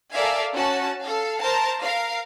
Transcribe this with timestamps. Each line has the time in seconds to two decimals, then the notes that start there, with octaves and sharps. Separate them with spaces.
0.13 A4 A#4 D5 E5 F5 G#5
0.55 C#4 F#4 A5
1.02 A4 F5
1.43 A#4 C5 A5 A#5
1.81 A#4 F5